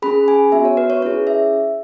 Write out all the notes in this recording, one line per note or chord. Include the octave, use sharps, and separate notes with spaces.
C#4 G#4 B5
G#5
B3 F#4 E5
C#5
B4
C#5
C#4 E4 G#4 C#5
E5